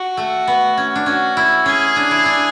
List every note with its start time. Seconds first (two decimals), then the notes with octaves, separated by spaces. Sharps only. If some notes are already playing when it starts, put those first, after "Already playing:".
Already playing: F#4
0.17 A3
0.48 B3
0.77 C#4
0.95 D4
1.06 C#4 F#4
1.37 E4
1.66 C#4 G#4
1.96 D4
2.11 E4
2.26 D4